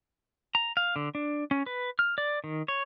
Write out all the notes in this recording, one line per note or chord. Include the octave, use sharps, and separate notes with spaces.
A#5
F5
D3
D4
C#4
B4
F6
D5
D#3
C#5